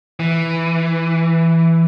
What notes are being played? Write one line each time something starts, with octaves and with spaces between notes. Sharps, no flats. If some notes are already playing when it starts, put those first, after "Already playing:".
E3